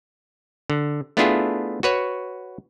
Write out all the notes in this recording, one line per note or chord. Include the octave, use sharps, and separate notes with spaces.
D3
A3 B3 D4 E4 F4 G#4
F#4 B4 C#5